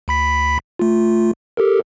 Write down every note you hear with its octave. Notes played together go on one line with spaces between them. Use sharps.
D2 B5 B6
A3 F4
G4 A4 A#4